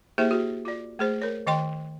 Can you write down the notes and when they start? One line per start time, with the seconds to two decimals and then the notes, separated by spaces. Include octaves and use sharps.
0.18 A#3 E4 G4 G#4 C5 E5
0.31 F#4 G#4
0.65 F4 D5
0.99 A3 G#4 C5
1.22 A#4 C#5
1.47 D#3 D#5 G5 C6